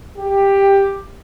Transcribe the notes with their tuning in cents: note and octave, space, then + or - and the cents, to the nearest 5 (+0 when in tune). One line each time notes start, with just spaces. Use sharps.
G4 +10